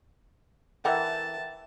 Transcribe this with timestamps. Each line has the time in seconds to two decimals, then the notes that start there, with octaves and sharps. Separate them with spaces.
0.85 E3 A4 A#4 E5 F#5 G5 A5